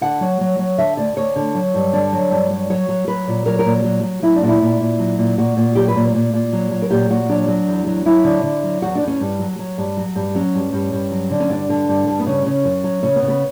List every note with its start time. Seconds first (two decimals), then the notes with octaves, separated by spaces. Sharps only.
0.01 D3 F#5
0.21 F#3
0.41 F#3
0.59 F#3
0.78 D3 E5
0.97 D2 D5
1.16 D2 C#5
1.36 D3
1.55 F#3
1.74 G2
1.93 D3 D5
2.13 F#3
2.31 G2
2.51 F#3
2.70 F#3 C#5
2.89 F#3
3.07 F#3 B4
3.27 A#2
3.46 F#3 A#4
3.59 A#4
3.65 A#2
3.84 F#3
4.03 F#3
4.22 F#3 E4
4.35 D4
4.42 A#2 F#4
4.48 E4
4.61 A#2
4.80 A#2
4.99 F#3
5.18 A#2
5.38 A#2 F#4
5.57 A#2
5.75 F#3 G4
5.88 B4
5.96 A#2
6.14 A#2
6.34 A#2
6.53 F#3
6.71 F#3
6.82 A#4
6.90 A#2 G4
7.10 A#2 F#4
7.29 F#3 D4
7.48 F#3
7.67 E2
7.86 F#3
8.05 F#3 E4
8.24 D3
8.43 D3
8.63 F#3
8.82 E2 F#4
8.95 D4
9.01 E2
9.08 C#4
9.20 G2
9.39 F#3
9.59 F#3
9.78 G2
9.97 F#3
10.15 G2
10.35 F#3 C#4
10.54 G2
10.73 G2
10.92 G2
11.11 F#3
11.30 D3
11.40 C#4
11.50 G2 D4
11.70 D3
11.88 G2
12.07 G2
12.20 B3
12.26 C#3 C#4
12.46 C#3
12.64 F#2
12.84 F#3
13.03 C#3 C#4
13.16 B3
13.22 C#3
13.28 B3